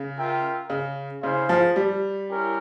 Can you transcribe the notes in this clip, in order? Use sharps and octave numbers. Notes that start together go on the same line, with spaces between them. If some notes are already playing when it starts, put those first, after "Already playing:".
Already playing: C#3
F4 A#4 E5 G5
C#3
C#3 E4 G#4 C5 F5
F3
G3
C#4 E4 G4 A#4